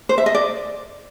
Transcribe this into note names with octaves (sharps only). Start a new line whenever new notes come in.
C5
E5
D#5
D5